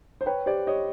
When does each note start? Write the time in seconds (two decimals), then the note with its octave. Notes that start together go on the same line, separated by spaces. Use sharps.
0.21 C5
0.26 B4 C#5 G5
0.46 G4 C5 D5
0.67 G4 C#5 D#5